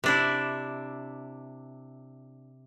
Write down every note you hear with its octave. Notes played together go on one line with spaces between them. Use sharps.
C3 D4 E4